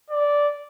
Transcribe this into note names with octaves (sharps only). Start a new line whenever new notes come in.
D5